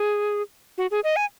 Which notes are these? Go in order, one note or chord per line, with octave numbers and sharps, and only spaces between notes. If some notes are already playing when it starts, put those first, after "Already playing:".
Already playing: G#4
F#4
G#4
D#5
G#5